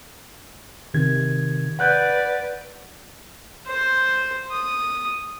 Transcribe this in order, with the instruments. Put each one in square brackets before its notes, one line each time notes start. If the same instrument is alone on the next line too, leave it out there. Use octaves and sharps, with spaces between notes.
[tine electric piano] C3 D#3 G#6
[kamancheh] B4 D5 [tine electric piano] F#5 F#6 G6
[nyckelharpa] C5
D#6